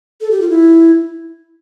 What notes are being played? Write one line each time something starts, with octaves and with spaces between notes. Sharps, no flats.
A4
G4
F4
E4